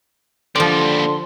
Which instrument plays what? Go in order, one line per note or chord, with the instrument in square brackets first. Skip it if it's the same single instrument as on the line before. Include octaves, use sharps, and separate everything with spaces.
[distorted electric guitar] D#2 G3 [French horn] D3 [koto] F3 D5 [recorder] C6